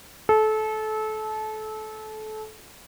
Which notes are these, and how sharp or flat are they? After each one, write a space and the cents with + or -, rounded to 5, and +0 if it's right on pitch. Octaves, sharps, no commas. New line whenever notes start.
A4 -25